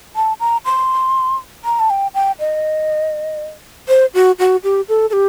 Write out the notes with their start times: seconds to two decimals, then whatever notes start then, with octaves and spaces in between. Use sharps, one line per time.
0.16 A5
0.40 A#5
0.65 C6
1.65 A#5
1.80 A5
1.90 G5
2.14 G5
2.39 D#5
3.88 C5
4.14 F#4
4.39 F#4
4.64 G4
4.89 A4
5.10 A4
5.13 G4